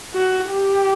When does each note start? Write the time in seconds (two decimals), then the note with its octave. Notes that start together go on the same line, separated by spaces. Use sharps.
0.14 F#4
0.50 G4